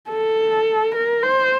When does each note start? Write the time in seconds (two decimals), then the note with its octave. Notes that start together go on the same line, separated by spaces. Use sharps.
0.10 A4
0.95 A#4
1.23 C5